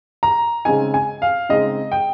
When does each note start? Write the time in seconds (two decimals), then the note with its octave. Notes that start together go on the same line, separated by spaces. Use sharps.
0.23 A#5
0.65 C#3 G#3 C4 D#4 G#5
0.94 G#5
1.22 F5
1.49 C#3 G#3 C4 D#4 D#5
1.92 G5